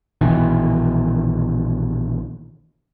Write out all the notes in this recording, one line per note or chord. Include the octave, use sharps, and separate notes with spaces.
A#1 B2 D#3 E3